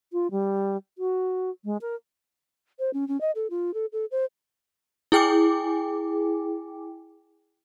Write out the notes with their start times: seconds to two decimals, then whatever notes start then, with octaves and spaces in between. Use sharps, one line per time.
0.12 F4
0.31 G3
0.98 F#4
1.65 G#3
1.82 A#4
2.79 C5
2.94 C#4
3.08 C#4
3.21 D#5
3.35 A4
3.50 F4
3.74 A4
3.93 A4
4.11 C5
5.12 E4 G#4 G5 G#5 D6